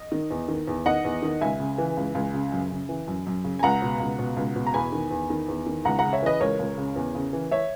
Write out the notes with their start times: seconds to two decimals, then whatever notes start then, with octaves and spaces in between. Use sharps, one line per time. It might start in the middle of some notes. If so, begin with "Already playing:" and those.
Already playing: D#5
0.12 D#3
0.31 E2
0.48 D#3
0.68 E2
0.86 D#3 D#5 F#5
1.05 E2
1.23 D#3
1.41 C#2 E5 G#5
1.60 C#3
1.78 E3
1.97 C#2
2.15 C#2
2.34 C#3
2.52 F#2
2.71 C#3
2.89 E3
3.08 F#2
3.27 F#2
3.44 C#3
3.59 G#5
3.63 C#2 F#5 A#5
3.82 B2
4.00 C#2
4.19 B2
4.37 C#2
4.56 B2
4.66 A#5
4.74 E2 G#5 B5
4.92 D#3
5.11 E2
5.30 D#3
5.48 E2
5.67 D#3
5.85 C#2 F#5 A#5
5.99 C#3 F#5 A#5
6.13 C#5 E5
6.23 E3 B4 D#5
6.40 C#2 A#4 C#5
6.59 C#2
6.78 C#3
6.96 E2
7.15 C#3
7.33 E3
7.51 C#5 E5